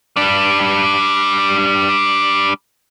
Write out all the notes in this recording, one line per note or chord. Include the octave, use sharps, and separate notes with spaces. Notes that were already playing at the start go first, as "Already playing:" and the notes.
G3 D4